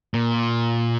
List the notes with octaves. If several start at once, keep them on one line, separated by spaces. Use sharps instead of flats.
A#2